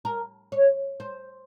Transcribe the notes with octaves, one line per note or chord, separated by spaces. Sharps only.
A#4
C#5
C5